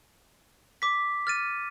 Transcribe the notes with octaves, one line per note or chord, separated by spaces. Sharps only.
D6 B6
F6 A6 D#7